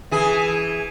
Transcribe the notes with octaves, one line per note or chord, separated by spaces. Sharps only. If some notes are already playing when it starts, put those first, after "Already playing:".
E3 G#4